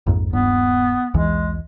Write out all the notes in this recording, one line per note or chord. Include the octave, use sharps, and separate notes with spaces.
A#1 F2 G#2
D#1 G2 B3
B1 E2 E3 G#3